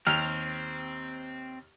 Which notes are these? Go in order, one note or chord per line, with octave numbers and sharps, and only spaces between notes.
D#2 C4 F6